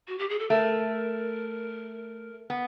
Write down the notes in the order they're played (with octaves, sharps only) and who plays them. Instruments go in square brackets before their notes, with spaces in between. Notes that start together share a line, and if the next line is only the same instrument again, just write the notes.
[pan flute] F#4
G4
G#4
A4
[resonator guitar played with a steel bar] A3 [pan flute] A#4
[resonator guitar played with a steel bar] B3